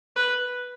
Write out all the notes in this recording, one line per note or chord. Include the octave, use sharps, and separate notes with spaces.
B4